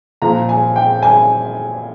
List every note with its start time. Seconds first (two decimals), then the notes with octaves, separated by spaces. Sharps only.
0.22 A#2 F3 A#5
0.49 G#5
0.76 G5
1.03 G#5